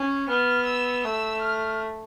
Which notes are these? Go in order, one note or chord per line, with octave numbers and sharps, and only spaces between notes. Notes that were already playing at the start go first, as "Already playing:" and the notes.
Already playing: C#4
B3 F6
E6
A3 E6
F6